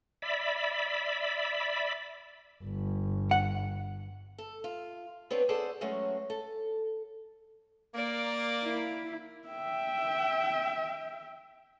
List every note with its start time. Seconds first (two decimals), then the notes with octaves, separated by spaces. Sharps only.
0.22 D5 E5 B5
2.64 G1
3.31 F#5
4.38 A4
4.64 F4
5.30 B3 C4 D4 B4 C#5
5.49 G#4 A4 C5 D5 F#5
5.81 F#3 G#3 A3 C#4 F#4
6.30 A4
7.95 A#3 A#4 D5
8.63 E4
9.48 E5 G5